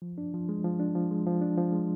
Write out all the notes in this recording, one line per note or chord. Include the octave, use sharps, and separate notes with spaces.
F3
D4
F3
G#3
F3
D4
F3
G#3
F3
D4
F3
G#3